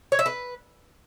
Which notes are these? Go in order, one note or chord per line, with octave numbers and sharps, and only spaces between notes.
C#5
E5
B4